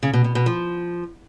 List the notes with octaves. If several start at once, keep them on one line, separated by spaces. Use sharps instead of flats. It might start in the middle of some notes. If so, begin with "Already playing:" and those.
C#3
B2
B2
B2
F3